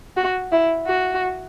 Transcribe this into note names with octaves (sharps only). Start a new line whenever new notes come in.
F#4
E4
F#4